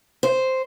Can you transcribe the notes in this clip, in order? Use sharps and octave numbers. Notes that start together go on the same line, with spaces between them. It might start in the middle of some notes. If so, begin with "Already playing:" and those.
C5